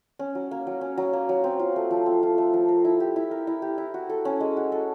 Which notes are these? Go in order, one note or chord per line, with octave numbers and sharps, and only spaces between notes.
C#4
F#3
A#3
F#3
C#4
F#3
A#3
F#3
C4
F4
A3
F3
C4
F4
A3
F3
A#4
E4
G4
E4
A#4
E4
G4
E4
F#4
A4
C#4
G#3
F#4
A4